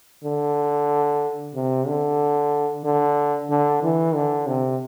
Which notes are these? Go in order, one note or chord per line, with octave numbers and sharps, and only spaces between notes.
D3
C3
D3
D3
D3
E3
D3
C3